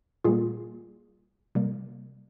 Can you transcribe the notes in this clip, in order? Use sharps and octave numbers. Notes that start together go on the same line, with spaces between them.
A#2 G3 A#3 F4 G#4
C3 G3 A#3